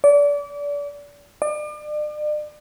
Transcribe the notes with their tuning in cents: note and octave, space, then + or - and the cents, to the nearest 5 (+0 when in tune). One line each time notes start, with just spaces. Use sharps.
D5 -30
D5 +40